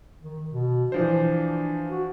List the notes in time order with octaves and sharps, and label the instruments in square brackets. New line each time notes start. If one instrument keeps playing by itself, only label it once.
[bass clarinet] D#3
B2
[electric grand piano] E3 F3 C5 [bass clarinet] D4
[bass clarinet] F#4